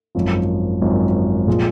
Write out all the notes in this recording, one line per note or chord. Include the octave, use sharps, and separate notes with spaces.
G#1 F#2 F3
G#1 F#2 F3
A#2 F3 G#3